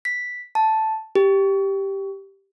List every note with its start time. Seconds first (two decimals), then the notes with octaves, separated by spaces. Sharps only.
0.05 B6
0.55 A5
1.15 G4